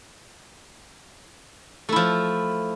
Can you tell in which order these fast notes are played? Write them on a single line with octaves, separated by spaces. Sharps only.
A3 E4 F3